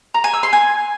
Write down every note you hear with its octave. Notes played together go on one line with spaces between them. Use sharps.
A#5
G#5
E6
C6
G#5